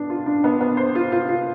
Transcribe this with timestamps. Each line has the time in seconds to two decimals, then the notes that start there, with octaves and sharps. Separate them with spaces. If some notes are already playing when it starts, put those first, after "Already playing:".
Already playing: B3 D4
0.10 F4
0.26 D4
0.44 B3
0.61 B3
0.77 C5
0.95 F4
1.12 F4
1.29 F4